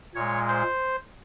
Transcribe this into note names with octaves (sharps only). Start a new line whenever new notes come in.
A#2 G#3 C#5
C5